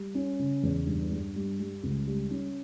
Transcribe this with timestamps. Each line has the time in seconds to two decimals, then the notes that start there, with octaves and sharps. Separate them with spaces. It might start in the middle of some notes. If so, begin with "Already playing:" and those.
Already playing: G3
0.15 C#4
0.39 C#3
0.63 E2
0.86 G2
1.11 G2
1.35 G3
1.60 G3
1.83 C#2
2.07 G3
2.31 C#4